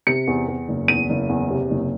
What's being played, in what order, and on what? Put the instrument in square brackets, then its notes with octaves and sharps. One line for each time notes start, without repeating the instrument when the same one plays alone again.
[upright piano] C3 C#7
E2
E2
F#1
E2 D#7
F#1
E2
C3
F#1